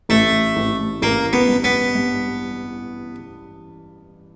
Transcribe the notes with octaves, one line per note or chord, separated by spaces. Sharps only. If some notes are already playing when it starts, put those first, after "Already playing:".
A1 A3
A1
A1 A#3
B3
G2
B3
G2